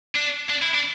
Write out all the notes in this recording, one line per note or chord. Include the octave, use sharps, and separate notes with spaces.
D4
D4
E4
D4